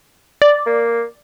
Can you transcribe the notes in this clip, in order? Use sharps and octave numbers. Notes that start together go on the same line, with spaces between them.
D5
A#3